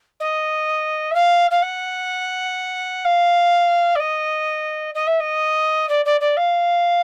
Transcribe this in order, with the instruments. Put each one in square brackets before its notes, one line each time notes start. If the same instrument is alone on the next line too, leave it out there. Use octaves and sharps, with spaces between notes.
[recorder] D#5
E5
F5
F5
F#5
F5
D5
D#5
D#5
E5
D#5
D5
D5
D5
F5